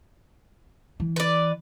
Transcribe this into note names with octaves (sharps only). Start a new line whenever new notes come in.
E3
B4 D5